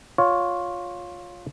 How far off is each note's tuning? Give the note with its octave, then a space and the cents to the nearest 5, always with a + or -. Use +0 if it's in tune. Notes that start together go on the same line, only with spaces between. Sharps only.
F4 +15 C#5 +10